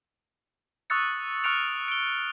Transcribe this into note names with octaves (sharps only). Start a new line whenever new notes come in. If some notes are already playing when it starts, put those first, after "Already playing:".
C#6 D#6 E6 F#6 A6 C#7
C#6 F6 F#6 C#7 D7 F7
D7 G7